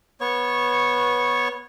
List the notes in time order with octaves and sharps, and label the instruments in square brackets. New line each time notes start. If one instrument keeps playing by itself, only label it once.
[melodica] B3 C#5 C#6